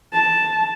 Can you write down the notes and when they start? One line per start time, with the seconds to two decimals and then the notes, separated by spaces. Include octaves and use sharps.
0.13 A5